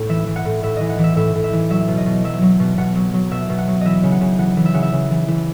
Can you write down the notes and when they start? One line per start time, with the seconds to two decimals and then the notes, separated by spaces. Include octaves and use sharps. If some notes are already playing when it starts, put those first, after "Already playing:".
Already playing: A2
0.09 E3 E5
0.27 E3
0.36 F#5
0.45 A2
0.63 A2 E5
0.77 E3 D#5
0.90 F#5
0.99 E3 E5
1.16 A2 E5
1.35 A2
1.44 E5
1.53 E3
1.70 F#3 E5
1.88 B2
1.97 D#5
2.06 B2
2.24 F#3 E5
2.42 F#3
2.60 B2
2.78 B2 F#5
2.95 F#3
3.14 F#3
3.31 B2 E5
3.50 B2
3.58 F#5
3.67 F#3
3.81 E3 D#5 E5
4.03 C#3
4.12 F#5
4.21 C#3
4.39 E3 F#5
4.57 E3
4.66 E5
4.74 C#3 F#5
4.83 E5
4.93 C#3
5.11 E3
5.28 E3